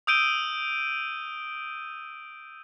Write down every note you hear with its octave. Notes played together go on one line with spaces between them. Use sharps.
D#6 E6 G6 D7 D#7 G7